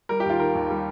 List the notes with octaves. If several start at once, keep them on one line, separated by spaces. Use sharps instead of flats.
G3 A#4
G4
D#2 F4
D#3 A#4
D#2
G3